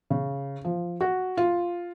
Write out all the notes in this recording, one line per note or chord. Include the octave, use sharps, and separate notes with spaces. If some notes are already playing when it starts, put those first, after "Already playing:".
C#3
F3
F#4
F4